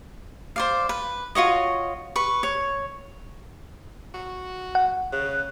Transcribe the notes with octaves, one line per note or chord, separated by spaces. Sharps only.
C5 D5 F5
B4
F4 F#4 C#5 D#5
B4 C#6
C#5
F#4
F#5
C#3 F#6